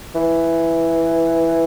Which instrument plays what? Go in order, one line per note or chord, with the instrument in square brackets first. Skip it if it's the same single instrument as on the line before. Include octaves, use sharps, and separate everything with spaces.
[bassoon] E3